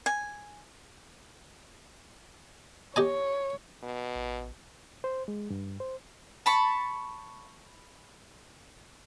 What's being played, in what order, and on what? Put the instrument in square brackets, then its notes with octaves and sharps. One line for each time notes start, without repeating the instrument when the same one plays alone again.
[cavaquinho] G#5
[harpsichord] G4 D#5 G#5 [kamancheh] C#5
[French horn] B2
[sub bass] A1
[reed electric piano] C5
G#3
G2
C5
[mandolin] A5 B5 C#6